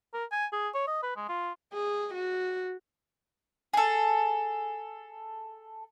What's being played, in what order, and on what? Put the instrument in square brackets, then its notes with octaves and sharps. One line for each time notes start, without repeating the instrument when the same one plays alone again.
[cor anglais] A#4
G#5
G#4
C#5
D#5
B4
G#3
F4
[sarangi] G#4
F#4
[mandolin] G#4 A4